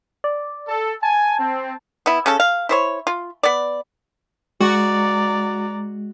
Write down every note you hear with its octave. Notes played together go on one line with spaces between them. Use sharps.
D5
A4
G#5 A5
C4
B3 E4
C#3 C#4 A4
F5
E4 C5 C#5
F4
B3 D5
G#3 F#4 D5 A#5